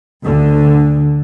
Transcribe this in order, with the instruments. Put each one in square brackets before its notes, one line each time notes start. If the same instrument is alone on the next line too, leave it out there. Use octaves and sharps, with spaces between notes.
[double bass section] D2 D3